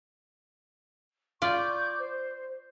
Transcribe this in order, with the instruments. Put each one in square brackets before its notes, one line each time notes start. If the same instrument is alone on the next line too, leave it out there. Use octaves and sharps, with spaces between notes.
[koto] F4 D5 [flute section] C#6 D6 G6
[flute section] C5